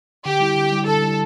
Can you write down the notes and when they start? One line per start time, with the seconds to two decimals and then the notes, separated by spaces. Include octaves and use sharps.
0.25 D3 G4
0.40 G3 E4
0.56 D3
0.72 G3 E4
0.87 D3 A4
1.03 G3 E4